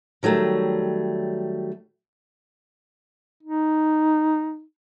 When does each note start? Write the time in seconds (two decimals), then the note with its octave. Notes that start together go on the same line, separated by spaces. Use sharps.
0.23 D#3 F#3 G3 A3
3.43 D#4